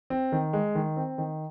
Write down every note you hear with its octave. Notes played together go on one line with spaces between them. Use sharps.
C4
D#3
G#3
D#3
C4
D#3